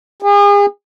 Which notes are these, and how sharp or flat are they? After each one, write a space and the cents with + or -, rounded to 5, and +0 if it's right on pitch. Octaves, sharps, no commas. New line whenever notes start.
G#4 -40